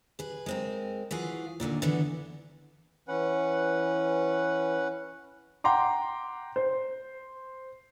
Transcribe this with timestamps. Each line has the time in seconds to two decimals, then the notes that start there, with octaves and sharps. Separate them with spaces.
0.19 G#4 B4
0.46 G#3 C4 A#4
1.11 E3 F4 F#4 G#4
1.60 A#2 D3 D#3 A#3
1.82 D3 E3 B3
3.08 E3 C#4 B4 F#5
5.64 F#5 G5 A#5 C6 D6
6.56 C5